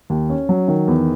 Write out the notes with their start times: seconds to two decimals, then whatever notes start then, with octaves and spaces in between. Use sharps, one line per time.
0.10 D#2
0.30 C#4
0.49 F#3
0.68 D#3
0.88 E2